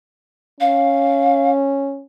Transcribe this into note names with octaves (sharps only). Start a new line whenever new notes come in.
C#4 F5